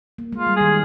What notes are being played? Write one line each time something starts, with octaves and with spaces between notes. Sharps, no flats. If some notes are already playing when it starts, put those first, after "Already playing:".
A#3
G#3
F4
G3
D#3 G#4